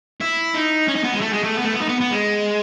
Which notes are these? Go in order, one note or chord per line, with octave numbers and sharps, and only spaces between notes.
E4
D#4
C#4
D#4
B3
G#3
A3
G#3
A3
B3
A3
B3
D#4
B3
B3
G#3